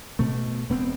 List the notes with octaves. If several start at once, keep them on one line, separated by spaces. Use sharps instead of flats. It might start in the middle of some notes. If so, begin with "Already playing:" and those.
B2 A3
E1 B3 C4